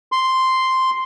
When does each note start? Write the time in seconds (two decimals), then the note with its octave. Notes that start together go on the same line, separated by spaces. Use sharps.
0.12 C6